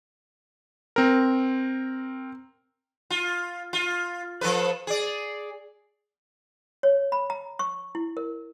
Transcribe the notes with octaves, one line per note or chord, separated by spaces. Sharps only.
C4 A#4
F4
F4
F3 A4 B4
G#4 D5
C#5
B5
A#5
C#6
E4
A#4